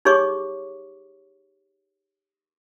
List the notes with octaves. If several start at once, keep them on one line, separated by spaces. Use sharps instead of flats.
D#4 G4 G#4 C#5 C#6 D6